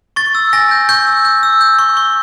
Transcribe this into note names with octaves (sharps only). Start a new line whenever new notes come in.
C#6 A6
E6
G#5 A#6
G6
C#6 G6
E6
G6
E6
G6
C#6
C#6